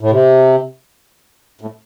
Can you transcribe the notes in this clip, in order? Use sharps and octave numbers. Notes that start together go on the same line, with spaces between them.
A2
C3
A2